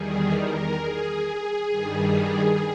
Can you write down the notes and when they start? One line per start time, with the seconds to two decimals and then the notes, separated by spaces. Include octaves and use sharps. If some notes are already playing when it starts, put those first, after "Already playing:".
Already playing: E2 D#3 G3 G#4
0.29 A#4
0.76 G#4
1.24 G#4
1.70 G2 D#3 G3